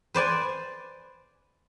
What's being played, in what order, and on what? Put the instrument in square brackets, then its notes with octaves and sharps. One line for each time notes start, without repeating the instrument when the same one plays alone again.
[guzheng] B4 C5 D5 G#5